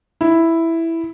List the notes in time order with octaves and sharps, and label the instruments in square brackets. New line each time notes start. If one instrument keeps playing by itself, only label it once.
[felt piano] E4